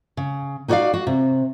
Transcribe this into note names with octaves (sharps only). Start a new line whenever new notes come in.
C#3
D#4 F#4 G#4 C#5 D5 F5
F#4
C3